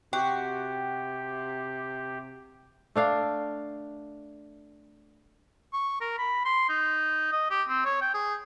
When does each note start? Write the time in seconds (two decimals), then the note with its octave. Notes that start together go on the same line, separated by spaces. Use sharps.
0.13 C3 F#4 G4 G5
2.96 A3 D4 F5
5.73 C#6
6.01 A#4
6.18 B5
6.45 C6
6.69 D#4
7.32 D#5
7.51 G4
7.69 C4
7.85 C#5
8.02 G5
8.14 G#4